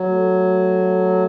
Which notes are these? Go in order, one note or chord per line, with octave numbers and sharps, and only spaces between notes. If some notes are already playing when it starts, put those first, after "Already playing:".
Already playing: F#3
A3